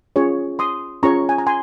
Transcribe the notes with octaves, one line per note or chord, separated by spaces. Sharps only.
C#4 F4 G#4 C#5
C6 D#6
C#4 F4 G#4 C#5 A#5 C#6
G#5
A#5
G#5 C6